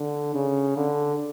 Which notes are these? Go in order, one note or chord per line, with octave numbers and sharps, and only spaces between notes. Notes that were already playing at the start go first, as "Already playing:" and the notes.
Already playing: D3
C#3
D3